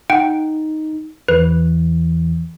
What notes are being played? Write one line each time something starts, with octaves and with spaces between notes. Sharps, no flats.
D#4 F#5 G5
E2 E3 B4